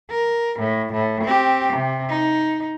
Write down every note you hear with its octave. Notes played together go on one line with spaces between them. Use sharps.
A#4
A2
A2
C4 G4
C3
D#4